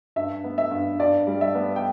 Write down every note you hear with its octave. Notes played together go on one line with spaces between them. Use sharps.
G2 E5
B3
E5
G2
G2 D5
G3
E5
B3
G5